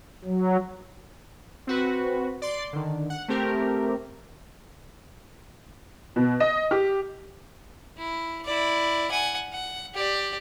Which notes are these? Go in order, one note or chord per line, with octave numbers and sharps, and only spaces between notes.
F#3
C4 F#4 B4
D5 C6
D3 D#3
F#5
A3 C4 G4 A#4
B2
D#5
G4
E4
E4 D5
F#5 G#5
F#5
G4 D5